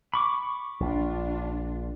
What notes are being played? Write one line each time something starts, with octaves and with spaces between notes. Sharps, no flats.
B5 C#6 D6
A#1 D4 F4